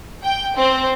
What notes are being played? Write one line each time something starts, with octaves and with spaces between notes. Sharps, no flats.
G5
C4